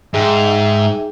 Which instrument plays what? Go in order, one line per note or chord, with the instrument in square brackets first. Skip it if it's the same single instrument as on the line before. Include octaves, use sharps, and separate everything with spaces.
[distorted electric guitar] G#2 [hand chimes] D#4 G#4 G5 [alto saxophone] E5